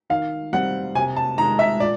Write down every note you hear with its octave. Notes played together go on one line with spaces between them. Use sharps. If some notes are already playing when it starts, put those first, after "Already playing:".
D#3 F5
G3 C4 F#5
C3 G#5
A5
D#3 G#3 A#5
E5
A#2 D5